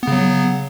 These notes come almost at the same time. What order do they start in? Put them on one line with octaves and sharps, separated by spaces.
B3 C#3 F#3